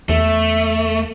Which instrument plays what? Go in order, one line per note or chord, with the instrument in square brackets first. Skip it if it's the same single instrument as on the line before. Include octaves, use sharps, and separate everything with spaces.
[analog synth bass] E2 [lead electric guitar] A3 [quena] E5